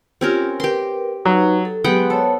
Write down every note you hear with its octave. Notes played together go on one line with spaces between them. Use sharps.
C4 C#4 F4 G4 A#4
G4 A#4 B4 C6
F#3 D#4 B4
A4
F#3 G#3 B3 G4 F#5 G5
A4 C5 C#5 A5